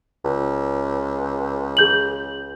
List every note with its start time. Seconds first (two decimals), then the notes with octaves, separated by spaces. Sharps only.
0.24 C#2
1.77 G#4 G6 F#7